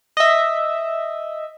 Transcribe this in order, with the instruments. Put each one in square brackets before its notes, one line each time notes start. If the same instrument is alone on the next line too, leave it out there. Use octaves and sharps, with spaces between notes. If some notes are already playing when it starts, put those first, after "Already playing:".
[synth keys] D#5 E5